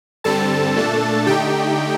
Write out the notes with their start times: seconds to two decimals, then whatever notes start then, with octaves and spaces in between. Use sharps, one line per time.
0.24 G2 D3 G3 C4 A4 A5
0.76 A#2 A3 D4
1.27 D3 A3 D#4 G4 G5